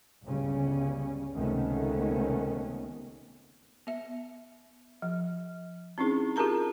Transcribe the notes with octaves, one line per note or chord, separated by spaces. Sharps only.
G1 C#2 C#3 G3 C#4
C#2 C3 D#3 A3 B3 C#4
B3 E5
F3
C4 C#4 D#4 E4 G#4
F4 G4 G#4 A#4 A5 A#5